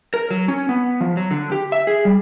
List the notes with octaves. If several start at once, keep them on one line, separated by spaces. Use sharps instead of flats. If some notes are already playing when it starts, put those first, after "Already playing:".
A#4
F#3
C#4
B3
F3
F#3
D3
G4
E5
G#4
G3